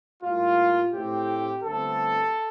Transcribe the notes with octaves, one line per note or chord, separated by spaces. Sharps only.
A2 G3 A#3 F4
A2 A3 C4 G4
G1 G2 D3 A3 C4 A4